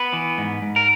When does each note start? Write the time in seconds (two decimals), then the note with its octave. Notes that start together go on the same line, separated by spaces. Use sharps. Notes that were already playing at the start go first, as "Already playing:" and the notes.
Already playing: B3 B4
0.13 E3
0.38 G#2
0.62 G#2
0.76 A#4